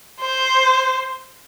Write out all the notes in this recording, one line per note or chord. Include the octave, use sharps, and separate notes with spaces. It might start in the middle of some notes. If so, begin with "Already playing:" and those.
C5